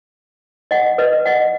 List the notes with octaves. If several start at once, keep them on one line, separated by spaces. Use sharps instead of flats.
D#5 F#5
B4 D#5
D#5 F#5